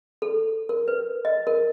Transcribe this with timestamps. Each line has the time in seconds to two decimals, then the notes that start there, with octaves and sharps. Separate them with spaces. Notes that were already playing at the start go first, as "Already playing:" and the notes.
0.22 A4
0.69 A#4
0.88 B4
1.25 D#5
1.47 A#4